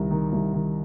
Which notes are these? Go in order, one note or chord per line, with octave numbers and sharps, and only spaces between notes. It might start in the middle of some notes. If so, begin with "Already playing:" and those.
Already playing: C2 D#3
D#3
C2
D#3